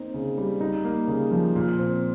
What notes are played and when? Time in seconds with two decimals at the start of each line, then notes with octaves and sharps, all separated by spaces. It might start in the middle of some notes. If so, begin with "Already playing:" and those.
Already playing: A#3 C4 D#4
0.14 C#3
0.38 G3
0.61 D#4
0.84 A#3
1.08 C#3
1.32 F3
1.56 A#2
1.79 C4